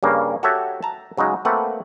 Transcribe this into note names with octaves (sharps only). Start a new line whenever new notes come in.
G2 C#3 A#3
F#4 G4 A4 C#5 E5
A5 A#5
C#3 F#3 G#3 D#4
A3 A#3 C4 B4 F#5